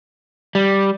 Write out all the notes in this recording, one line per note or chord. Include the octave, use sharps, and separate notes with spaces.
G3